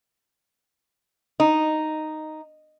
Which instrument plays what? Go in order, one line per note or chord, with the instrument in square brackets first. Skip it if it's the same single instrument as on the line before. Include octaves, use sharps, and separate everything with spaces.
[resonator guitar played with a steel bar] D#4